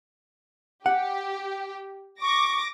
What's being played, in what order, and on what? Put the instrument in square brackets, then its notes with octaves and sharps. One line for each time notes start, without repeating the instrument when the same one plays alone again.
[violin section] G4 [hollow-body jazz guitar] F#5
[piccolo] C#6 [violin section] D6 A#6